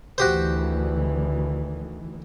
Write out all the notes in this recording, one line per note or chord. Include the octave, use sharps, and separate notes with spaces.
D2 D#3 E3 F#4 G4 C5